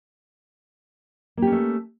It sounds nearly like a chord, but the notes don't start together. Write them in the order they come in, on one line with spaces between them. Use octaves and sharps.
A#3 G4 C#4 A3